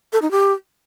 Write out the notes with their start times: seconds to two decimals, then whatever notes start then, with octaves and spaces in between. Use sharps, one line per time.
0.13 A4
0.22 D#4
0.31 G4